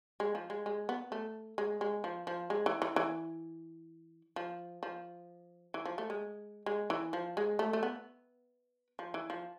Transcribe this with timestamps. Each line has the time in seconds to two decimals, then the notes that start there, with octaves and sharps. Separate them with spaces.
0.20 G#3
0.35 F3
0.50 G#3
0.66 G#3
0.89 B3
1.12 A3
1.58 G#3
1.81 G#3
2.04 F3
2.27 F3
2.50 G#3
2.66 E3
2.82 E3
2.96 E3
4.36 F3
4.83 F3
5.74 E3
5.85 F3
5.98 A3
6.10 G#3
6.66 G#3
6.90 E3
7.13 F3
7.37 G#3
7.59 A3
7.73 A3
7.83 B3
8.99 F3
9.14 E3
9.30 F3